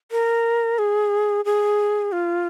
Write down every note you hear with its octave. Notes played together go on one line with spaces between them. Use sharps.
A#4
G#4
G#4
F4